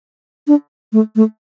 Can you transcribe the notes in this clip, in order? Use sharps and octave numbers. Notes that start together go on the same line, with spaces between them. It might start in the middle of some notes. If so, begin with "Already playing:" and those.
D4
A3
A3